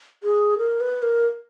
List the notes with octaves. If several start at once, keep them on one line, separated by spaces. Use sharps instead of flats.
G#4
A#4
B4
A#4